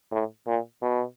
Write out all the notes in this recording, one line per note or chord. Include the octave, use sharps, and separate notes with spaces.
A2
A#2
B2